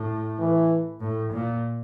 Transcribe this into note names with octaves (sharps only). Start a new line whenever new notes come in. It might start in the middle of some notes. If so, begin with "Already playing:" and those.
Already playing: A2
E3
A2
A#2